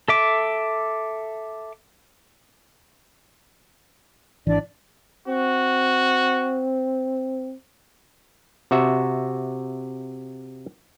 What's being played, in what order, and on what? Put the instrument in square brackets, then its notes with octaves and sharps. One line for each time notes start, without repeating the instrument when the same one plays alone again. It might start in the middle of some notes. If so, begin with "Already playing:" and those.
[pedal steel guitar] A4 E5 D6
[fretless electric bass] G#1 E3 [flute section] D4 D5
[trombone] C4 [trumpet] F#4
[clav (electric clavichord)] C3 F#4 E5